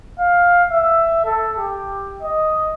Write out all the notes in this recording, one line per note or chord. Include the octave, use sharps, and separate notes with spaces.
F5
E5
A4
G4
D#5